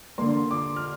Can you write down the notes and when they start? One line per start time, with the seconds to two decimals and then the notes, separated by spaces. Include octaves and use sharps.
0.18 D3 A#3 C6
0.51 D6
0.76 F6